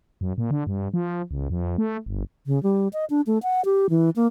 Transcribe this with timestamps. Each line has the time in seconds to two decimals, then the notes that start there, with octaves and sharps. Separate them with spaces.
0.21 F#2
0.38 A#2
0.51 D3
0.67 G2
0.94 F3
1.31 C#2
1.50 F2
1.78 A3
2.06 G1
2.47 C#3
2.63 G3
2.93 D#5
3.10 D4
3.26 A3
3.43 F#5
3.65 G4
3.90 E3
4.16 A#3